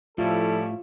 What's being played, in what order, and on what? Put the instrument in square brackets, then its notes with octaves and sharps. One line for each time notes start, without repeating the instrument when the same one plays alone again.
[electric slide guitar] A2 [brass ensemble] F3 A4 [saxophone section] G3 C#4 E4 [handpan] F4